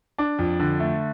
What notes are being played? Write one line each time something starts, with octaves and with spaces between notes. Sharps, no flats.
D4
F2
D3
A3